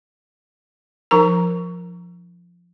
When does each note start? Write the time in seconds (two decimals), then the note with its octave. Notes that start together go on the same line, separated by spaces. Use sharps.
1.11 F3 D#4 A#4 A#5